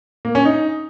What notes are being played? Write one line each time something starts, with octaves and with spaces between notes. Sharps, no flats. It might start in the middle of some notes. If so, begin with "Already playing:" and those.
A#3
C#4
D#4